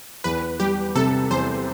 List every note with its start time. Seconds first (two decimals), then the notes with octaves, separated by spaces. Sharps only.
0.24 E2 B4
0.60 G3 G4
0.95 C3 A4
1.31 E2 C5